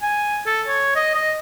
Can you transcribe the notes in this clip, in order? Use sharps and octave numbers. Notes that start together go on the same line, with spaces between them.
G#5
A4
C#5
D#5
D#5